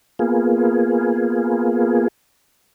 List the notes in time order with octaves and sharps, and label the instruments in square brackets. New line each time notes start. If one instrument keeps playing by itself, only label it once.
[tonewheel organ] A#3 B3 F4 G#4